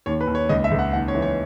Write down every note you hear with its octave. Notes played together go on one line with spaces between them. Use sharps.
D#2 C#5
B4
D#2
C#5
C#2 D#5
E5
C#2
F#5
D#2 F#5
C#5
E3
C#5